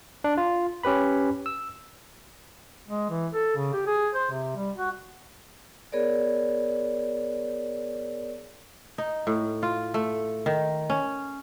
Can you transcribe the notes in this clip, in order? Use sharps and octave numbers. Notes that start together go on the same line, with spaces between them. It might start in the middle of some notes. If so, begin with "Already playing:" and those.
D4
F4
C#4 G4 B4 B5
E6
G#3
E3
A4
C#3
G4
G#4
C5
C3
G3
F#4
B3 G#4 A#4 C#5 D5
D#4
A2
F4
A3
D#3
C#4